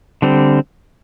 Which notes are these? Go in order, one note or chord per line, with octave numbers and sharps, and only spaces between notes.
D3 G3 C4